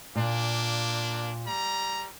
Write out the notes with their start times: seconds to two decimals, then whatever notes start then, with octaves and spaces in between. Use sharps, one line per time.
0.16 A#2 A#3 D4
1.46 G3 A#5